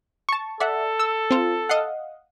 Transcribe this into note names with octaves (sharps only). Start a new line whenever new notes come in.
A5 C#6
A4 D5 E5 F#5
E6
C4 F4
D#5 F5 F#5